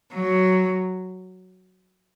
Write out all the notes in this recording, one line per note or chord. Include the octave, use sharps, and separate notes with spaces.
F#3